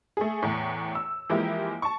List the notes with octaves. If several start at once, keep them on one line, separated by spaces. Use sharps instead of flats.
A3 G#4
E2 A2
E6
E3 F3 G#3 A#3 E4 G4
A5 C#6